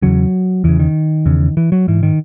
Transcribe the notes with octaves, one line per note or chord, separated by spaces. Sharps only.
E2 C#3 F#3
E2 C#3 E3
D#3
E2 C#3
E3
F#3
G#2 E3
D#3